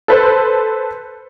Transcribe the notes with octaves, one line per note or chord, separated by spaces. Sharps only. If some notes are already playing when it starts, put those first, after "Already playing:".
A4 B4 C5